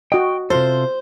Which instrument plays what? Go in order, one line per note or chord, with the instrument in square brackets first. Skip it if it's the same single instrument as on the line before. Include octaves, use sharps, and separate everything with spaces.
[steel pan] F#4 D#5 [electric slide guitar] G5
[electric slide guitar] C3 F4 A4 [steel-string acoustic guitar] C5